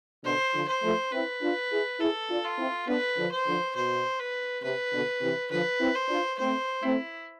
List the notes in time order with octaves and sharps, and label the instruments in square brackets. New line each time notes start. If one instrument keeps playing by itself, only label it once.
[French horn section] B2 D3 [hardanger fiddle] C5
[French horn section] D3 F3
[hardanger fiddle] C5
[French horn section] F3 A3
[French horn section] C4 E4 [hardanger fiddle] B4
[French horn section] D4 F4
E4 G#4
[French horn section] E4 G#4 [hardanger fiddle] A4
[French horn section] D4 F4
[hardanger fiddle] F4
[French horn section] C4 E4
[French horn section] B3 D4 [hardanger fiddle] B4
[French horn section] D3 F3
[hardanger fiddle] C5
[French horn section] D3 F3
[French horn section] B2 [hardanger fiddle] C5
[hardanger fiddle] B4
[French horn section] C3 [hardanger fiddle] B4
[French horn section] B2 D3
C3 E3
[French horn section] D3 F3 [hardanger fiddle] B4
[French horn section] C4 E4
[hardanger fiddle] C5
[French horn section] D4 F4
[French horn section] A3 C4 [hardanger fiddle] C5
[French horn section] A3 C4 [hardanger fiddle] E4